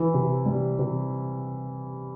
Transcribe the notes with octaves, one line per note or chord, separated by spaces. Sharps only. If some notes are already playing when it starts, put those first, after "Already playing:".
Already playing: E3
C3
G3
C3